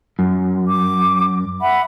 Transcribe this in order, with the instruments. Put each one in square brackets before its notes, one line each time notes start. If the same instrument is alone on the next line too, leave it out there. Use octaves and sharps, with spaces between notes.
[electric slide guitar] F#2
[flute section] D6
E5 F#5 B5